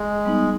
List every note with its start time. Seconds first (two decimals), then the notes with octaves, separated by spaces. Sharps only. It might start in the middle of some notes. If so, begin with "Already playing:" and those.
Already playing: G#3
0.25 G3 B3 D#4